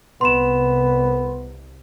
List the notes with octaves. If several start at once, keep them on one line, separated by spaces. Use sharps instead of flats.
C2 B3 C6 E7